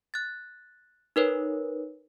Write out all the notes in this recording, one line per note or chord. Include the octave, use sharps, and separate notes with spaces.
F#6 A6
D#4 A#4 B4 C#5